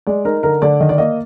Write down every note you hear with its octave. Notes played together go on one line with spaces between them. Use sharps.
G#3 D5
D#4 A#4
D3 A#4
D3 D5
D#3 D#5
D5
A#3 D#5